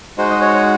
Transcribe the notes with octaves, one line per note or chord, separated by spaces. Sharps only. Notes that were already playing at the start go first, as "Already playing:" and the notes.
G#3 D#4 F#4 C5
D#5
C#5